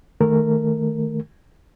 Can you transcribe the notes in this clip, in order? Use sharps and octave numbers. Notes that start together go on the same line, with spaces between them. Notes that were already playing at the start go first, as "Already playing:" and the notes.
D#3 A3 A#4